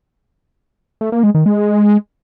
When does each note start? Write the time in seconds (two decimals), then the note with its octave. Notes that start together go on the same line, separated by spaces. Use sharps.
1.01 A3
1.12 A#3
1.23 G#3
1.35 D#3
1.46 G#3